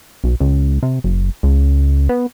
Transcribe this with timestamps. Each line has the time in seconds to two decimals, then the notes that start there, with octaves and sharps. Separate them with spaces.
0.24 B1
0.40 C#2
0.83 C3
1.04 F#1
1.43 C#2
2.09 B3